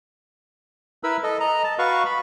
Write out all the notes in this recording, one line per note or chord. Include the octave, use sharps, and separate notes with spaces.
E4 A#4 B4 B5 E6
A4 D#5
D#5 A#5
A5
F#4 B4 F5 C#6
B5